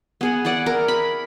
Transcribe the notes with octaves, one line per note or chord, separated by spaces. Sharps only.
B3 G#4 F#5
E4 G#4 D5 F#5
A#4
B5